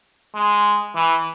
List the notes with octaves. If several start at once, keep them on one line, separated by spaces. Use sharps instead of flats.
G#3
E3